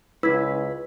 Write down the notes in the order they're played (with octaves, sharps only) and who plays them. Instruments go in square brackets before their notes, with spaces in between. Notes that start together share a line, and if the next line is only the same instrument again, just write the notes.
[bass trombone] C#2 [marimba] E4 [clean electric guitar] B4 [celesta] E6 G#6 B6